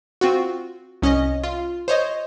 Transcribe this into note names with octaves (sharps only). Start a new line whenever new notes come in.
C4 F4 F#4
C2 C#4 D#5
F4
C5 C#5 D#5